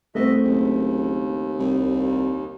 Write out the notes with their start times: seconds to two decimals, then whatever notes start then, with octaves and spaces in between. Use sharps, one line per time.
0.15 C2 A3 C4 F#4 D#5 E5
0.44 F#1 D#2
1.59 C2